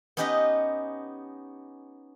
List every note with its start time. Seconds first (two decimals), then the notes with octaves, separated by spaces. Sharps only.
0.17 B3 C#4 D#4 G4 B4 D#5